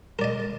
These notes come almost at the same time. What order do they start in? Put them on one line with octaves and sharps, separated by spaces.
A#4 D5 D#5